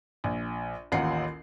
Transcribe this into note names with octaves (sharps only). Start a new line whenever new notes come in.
A#1
A1 D#2 F4 F#5 C7